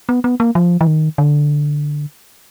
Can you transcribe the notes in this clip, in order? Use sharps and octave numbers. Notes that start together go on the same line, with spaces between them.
B3
B3
A#3
F3
E3
D#3
D3